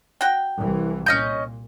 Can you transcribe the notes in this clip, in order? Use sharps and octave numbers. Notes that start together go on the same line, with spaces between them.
F#4 G5
C2 E3
A#2 C#4 D#5 G6